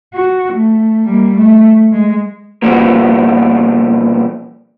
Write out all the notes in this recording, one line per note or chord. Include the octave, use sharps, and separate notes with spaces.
F#4
A3
G3 A#3
A3
G#3
B2 F3 G3 A#3